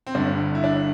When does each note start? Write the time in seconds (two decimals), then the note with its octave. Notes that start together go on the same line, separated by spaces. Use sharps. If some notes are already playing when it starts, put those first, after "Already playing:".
0.07 C4
0.15 G1 G2 D3 D4
0.55 E4
0.64 D4